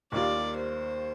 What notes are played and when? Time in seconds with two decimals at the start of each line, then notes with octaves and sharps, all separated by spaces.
0.12 D#2 D#3 G3 A#3 F4 D5
0.56 C5